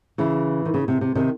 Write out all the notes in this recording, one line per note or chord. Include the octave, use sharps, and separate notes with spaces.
C#3 E3
D#3
C#3
C3
C3
C3 D#3